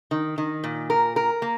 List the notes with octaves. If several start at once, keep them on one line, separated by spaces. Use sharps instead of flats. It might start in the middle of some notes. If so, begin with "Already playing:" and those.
D#3
D#3
A#2
A#4
A#4
A#3